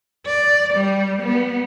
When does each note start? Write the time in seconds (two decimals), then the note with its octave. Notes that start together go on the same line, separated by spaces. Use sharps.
0.26 D5
0.74 G3
1.22 B3